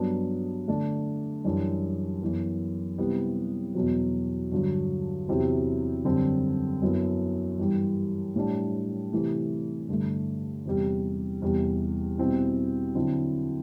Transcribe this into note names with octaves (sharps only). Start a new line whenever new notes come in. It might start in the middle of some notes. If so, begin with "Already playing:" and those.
Already playing: G2 F#3 B3 D4
D3 A3 D4
F#2 E3 G3 D4
F#2 E3 B3
C3 G3 B3 E4
E2 B2 F#3
G2 D3 F#3
E2 C3 F#3 C4 E4
F#2 D3 G3 C4
F#2 F#3 B3 E4
G2 E3 G3
A2 G3 D4
C3 E3 A3
G2 D3 A3
E2 C3 G3
E2 C3 G3
B2 G3 C4 E4
D3 F#3 C4 E4